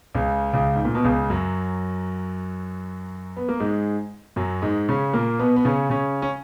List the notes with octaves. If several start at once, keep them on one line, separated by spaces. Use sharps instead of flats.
C#2 C#3
C#2 C#3
G#2
A#2
B2
C#2 C#3
F#2 F#3
B3
A#3
G#2 G#3
F#2 F#3
G#2 G#3
C#3 C#4
A#2 A#3
B2 B3
B3
C#3 C#4
C#3 C#4
C#4